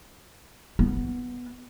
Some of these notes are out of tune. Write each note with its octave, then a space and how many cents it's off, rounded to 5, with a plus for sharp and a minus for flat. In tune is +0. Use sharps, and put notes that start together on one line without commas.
B3 -5